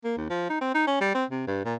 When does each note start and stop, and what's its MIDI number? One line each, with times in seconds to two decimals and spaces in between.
0.04 0.15 58
0.17 0.26 39
0.30 0.45 53
0.50 0.59 63
0.61 0.72 60
0.75 0.85 63
0.87 1.00 61
1.01 1.14 55
1.15 1.25 60
1.30 1.43 48
1.47 1.61 43
1.65 1.75 46